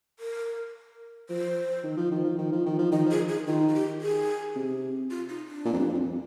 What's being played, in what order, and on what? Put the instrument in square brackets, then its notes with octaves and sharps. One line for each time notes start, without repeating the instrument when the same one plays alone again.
[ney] A#4
[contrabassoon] F3 [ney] C5
[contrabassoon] D#3
F3
D#3
F3
D#3
F3
D#3
F3
[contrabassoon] D#3 [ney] D#5
[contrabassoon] F3 [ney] G#4
[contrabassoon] D#3
[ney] G#4
[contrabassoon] D#3 [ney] F4
[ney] F4
G4
G#4
[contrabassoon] C3
[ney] F4
D#4
D4
[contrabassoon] A#2
F2
G2
F2